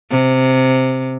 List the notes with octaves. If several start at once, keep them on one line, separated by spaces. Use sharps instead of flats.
C3